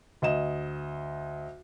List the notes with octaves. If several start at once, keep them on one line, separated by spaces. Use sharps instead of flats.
D2 D#5 E7